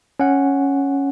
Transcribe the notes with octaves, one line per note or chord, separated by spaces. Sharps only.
C#4 F#5